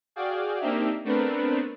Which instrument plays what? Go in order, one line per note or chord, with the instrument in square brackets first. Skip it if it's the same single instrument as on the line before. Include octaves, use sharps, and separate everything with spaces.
[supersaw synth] F#4 G#4 D5 F5 G5
A#3 C4 D4 D#4 G4 E5
A3 B3 C4 D4 A#4 B4